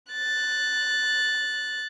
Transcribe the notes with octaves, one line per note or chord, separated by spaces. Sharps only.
F#6 A6